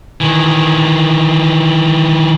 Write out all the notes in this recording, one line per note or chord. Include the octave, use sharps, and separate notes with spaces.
D#3 E3